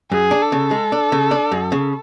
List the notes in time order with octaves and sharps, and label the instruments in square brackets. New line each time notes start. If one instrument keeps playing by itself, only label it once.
[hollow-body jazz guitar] F#2 [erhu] G#4
[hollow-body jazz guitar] D4
[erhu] A4
[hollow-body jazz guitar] C#3
G#3
D4
C#3
D4
F#2
C#3